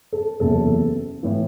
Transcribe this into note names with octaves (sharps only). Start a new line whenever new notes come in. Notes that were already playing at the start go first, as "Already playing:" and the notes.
A4
F#1 E2 C3 A4
A2 E3